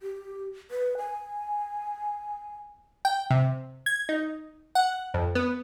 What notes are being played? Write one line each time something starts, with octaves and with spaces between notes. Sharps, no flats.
G4
B4
G#5
G5
C3
G#6
D#4
F#5
F2
B3